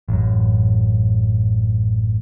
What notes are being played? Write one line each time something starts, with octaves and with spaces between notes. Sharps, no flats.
A1 F#2